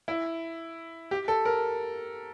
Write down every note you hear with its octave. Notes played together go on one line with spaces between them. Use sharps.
E4
G4
A4
A#4